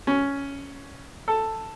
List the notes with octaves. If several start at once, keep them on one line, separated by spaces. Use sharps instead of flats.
C#4
A4